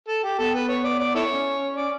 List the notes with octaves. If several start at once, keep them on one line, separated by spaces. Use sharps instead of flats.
A4
G4
B3 A4
B4
C#5
D5
D5
E4 A4 C#5
C#4
D5